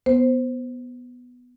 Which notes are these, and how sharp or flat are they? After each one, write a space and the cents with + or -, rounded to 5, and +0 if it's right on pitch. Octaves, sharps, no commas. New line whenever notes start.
B3 +0 C5 +0